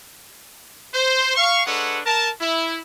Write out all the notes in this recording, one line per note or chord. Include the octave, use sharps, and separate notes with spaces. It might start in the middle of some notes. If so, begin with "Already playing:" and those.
C5
F5 C#6
G#3 D4 A4 B4 C#5 F#5
A#4 A5
E4